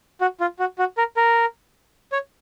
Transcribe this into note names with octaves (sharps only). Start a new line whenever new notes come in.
F#4
F4
F#4
F#4
A#4
A#4
C#5